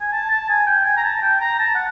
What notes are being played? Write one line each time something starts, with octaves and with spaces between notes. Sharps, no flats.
G#5
A5
A5
G#5
G5
G#5
A#5
A5
G5
A#5
A5
F#5